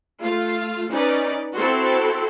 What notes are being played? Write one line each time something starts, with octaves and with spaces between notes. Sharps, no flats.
A3 F4 F5
C#4 D#4 B4 D5
C4 E4 F#4 A4 C6